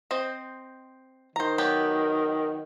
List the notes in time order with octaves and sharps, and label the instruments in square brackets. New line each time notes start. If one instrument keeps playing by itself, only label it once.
[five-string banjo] C4 C5 D#5
[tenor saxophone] D#3 [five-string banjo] C5 A#5
[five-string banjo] F#3 B3 G4